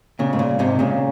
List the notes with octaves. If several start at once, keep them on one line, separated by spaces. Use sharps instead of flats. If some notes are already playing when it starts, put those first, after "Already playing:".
A#2 C#3
G#2
A#2
G#2 C3
A#2 C#3